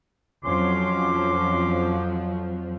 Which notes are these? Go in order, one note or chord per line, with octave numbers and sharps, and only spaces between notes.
F2 F3 F#3 C#4 C6 D6